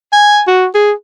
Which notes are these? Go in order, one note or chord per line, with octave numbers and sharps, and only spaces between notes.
G#5
F#4
G#4